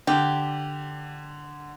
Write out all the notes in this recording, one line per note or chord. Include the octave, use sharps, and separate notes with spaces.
D3 G4